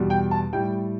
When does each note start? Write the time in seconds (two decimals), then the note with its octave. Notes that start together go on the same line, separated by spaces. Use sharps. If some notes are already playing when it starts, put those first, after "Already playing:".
Already playing: E2 B2 G3
0.10 G5
0.31 A5
0.53 A2 G3 G5